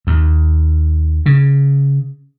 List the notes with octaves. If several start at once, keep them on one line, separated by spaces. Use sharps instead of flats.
D#2
C#3